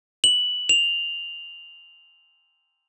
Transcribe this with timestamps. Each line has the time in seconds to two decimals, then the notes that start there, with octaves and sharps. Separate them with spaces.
0.24 F#7
0.69 F7